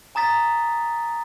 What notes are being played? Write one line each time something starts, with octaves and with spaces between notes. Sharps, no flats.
G#5 A#5 D#6 A6 B6